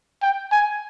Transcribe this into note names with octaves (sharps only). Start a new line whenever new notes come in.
G5
G#5